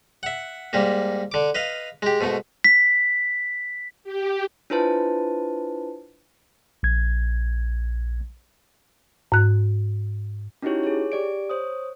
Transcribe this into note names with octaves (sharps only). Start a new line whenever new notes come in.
E5 F#5
G#2 G3 A#3
D3 D6
B4 D#5 F5
G#3 G4
G#2 B2 A3
B6
G4
D4 E4 F4 B4 C5 A5
A#1 G#6
G#2 F#6
C#4 D#4 E4 F#4 G4 C#5
G#4 C#5
G4 D5 D7
C5 C#5 D#6